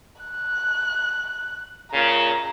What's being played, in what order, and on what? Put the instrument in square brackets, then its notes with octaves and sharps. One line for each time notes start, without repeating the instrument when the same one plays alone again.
[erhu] F#6
[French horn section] A#2 C#3 [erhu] A#5